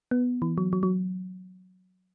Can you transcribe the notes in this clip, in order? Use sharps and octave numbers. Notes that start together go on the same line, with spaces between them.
B3
E3
F#3
F#3
F#3